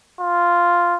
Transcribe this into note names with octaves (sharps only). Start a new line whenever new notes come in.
F4